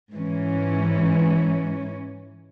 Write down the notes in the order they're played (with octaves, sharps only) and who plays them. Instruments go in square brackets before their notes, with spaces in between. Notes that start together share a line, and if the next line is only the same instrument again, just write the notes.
[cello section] G#2 E3 C#4